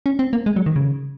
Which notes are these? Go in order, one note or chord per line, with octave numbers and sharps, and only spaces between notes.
C#4
C4
A#3
G#3
F#3
D#3
C#3